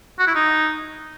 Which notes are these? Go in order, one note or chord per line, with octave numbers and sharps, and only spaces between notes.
F#4
E4
D#4